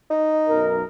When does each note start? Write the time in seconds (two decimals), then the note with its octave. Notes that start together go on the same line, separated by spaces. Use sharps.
0.10 D#4
0.48 B1 F#2 A#4